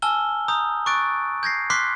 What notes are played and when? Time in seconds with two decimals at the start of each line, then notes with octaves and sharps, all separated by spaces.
0.02 G#5 A5 E6 F6 G7
0.48 A#5 D#6 G6
0.86 C#6 D6 F#6 A6 D7
1.43 G6 G#6 A#6 C7
1.70 C6 D6 F6 F#6 B6 C7